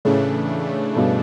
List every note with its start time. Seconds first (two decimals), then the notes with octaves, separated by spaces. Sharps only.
0.05 A2 C#3 E3 A3 D4
0.96 G2 B2